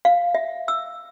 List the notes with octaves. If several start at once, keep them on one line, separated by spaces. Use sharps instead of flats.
F5
E5
E6